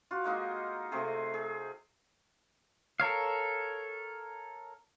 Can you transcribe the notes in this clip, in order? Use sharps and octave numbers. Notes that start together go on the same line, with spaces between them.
F4 F#4
G#3 A#3 D#4
C3 A3 C4 G#4
G#4
A4 A#4 C#5 F5